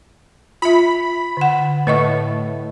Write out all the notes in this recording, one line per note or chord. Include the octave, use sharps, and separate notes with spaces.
F4 E5 B5
D3 F#5
A2 B4 D#5 C#6